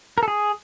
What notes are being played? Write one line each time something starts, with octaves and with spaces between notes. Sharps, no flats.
A#4
A4
G#4